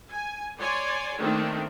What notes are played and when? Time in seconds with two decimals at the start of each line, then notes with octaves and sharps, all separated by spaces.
0.12 G#5
0.60 C#5 D5 G#5 C6
1.21 D#3 A3 A#3 C4 D4 D#4